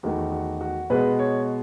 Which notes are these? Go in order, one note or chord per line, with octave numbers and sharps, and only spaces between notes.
E2 D#3 A3 F#4
F#4
F#4
B2 G#3 B3 B4
C#5